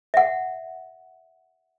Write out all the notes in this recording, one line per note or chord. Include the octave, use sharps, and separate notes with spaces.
E5 F#5